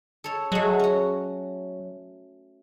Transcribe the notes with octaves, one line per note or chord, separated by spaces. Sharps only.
A4 C#5
F#3 G#3 A3
C#4 F#4